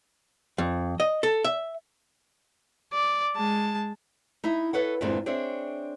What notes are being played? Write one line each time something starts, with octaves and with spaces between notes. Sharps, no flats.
F2
D#5
A4
E5
D5
G#3 A5
D#4 E4 E5
A4 B4 C#5 F#5
E2 G2 A#2 D3 G#3 C4
C4 D4 G#4 C#5 E5